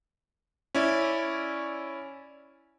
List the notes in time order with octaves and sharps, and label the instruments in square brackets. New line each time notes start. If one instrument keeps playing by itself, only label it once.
[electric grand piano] C#4 E4 D5